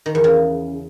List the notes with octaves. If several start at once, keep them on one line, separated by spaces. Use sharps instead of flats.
D#3
E2
C#3